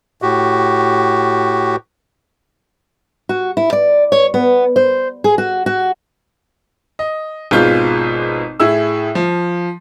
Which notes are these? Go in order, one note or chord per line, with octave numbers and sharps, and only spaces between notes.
A2 F#4 G4
F#4
E4
D5
C#5
B3
C5
G#4
F#4
F#4
D#5
G#1 B2 F4 G#4 G6
A2 E4 G#4 E6
F3